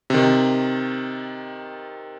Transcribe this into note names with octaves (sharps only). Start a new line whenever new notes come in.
C3 D#3